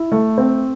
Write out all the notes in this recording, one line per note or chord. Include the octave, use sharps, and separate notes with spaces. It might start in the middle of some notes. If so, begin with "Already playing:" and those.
Already playing: E4
A3
C4